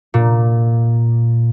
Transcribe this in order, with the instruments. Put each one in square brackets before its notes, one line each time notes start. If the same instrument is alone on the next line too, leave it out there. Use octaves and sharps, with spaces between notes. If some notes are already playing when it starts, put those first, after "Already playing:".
[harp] A#2